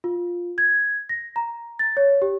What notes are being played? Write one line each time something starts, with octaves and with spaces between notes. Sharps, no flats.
F4
G#6
A#6
A#5
A6
C#5
G4